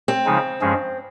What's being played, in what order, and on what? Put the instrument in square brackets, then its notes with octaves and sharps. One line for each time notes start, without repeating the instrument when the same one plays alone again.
[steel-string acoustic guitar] C4
[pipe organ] C#3 F3 G#3 D#4 G#4
G2 F3 G#3 C#4 G#4